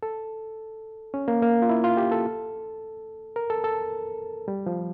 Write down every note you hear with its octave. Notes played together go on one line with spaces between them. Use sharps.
A4
C#4
A#3
A#3
F4
E4
F4
G4
A4
A#4
A4
A4
G3
F3